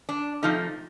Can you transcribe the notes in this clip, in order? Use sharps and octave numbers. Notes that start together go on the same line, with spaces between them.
D4
C3 F3 A3 D#4